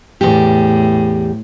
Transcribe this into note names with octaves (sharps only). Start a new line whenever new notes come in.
E2 A2 G4